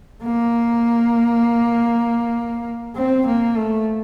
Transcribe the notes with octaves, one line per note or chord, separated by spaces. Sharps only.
A#3
C4
A#3
A3